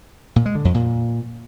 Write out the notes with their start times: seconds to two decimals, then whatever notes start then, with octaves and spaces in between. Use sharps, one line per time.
0.36 A#2
0.46 G#3
0.55 D3
0.65 F2
0.74 A#2